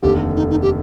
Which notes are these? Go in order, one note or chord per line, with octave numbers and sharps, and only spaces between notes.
F1 D#2 D3 G4
D#4
D#4
G4